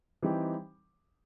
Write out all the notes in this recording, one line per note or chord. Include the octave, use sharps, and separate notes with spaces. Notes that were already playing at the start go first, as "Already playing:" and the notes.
E3 G3 C4 D#4 G4